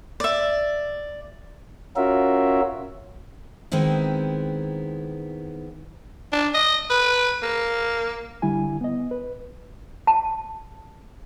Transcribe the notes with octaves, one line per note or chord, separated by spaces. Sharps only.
D5 E5
C#4 F4 F#4 A#4 E5
D#3 G#3 B3 C4 E4
D4
D#5
B4
A#3
D3 G3 E4 G#5
B3 D#5
B4
A5